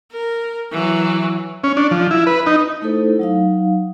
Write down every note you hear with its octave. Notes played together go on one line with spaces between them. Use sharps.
A#4
E3 F#3
C#4
D4
F3
E4
B4
D#4
A3 D#4 E4 A4 C5
F#3 D#4 F5